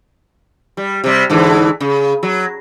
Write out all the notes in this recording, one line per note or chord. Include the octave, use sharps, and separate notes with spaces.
G3
C3 G3
G#2 D3 E3
C#3
F#3